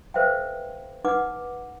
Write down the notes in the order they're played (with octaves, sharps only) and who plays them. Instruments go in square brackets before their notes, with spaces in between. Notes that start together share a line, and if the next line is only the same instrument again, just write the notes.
[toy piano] A4 B4 C5 E5 F5 G5
D#4 B4 F#5 D6